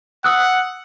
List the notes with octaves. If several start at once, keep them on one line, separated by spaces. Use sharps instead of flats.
F#5 D#6 E6 F#6